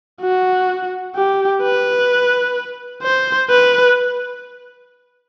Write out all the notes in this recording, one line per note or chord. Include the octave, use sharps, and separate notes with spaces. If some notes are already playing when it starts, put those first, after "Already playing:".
F#4
G4
B4
C5
B4